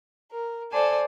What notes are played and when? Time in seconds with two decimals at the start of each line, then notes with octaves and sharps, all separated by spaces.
0.31 A#4
0.72 A4 C5 D5 G#5 A5